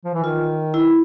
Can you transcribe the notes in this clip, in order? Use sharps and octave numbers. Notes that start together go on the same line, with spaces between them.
F3
E3
D#3 F4
E4